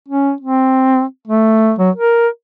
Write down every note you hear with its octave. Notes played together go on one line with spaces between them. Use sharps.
C#4
C4
A3
F#3
A#4